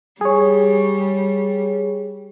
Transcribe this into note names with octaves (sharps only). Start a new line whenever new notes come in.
G3 G#4 C#5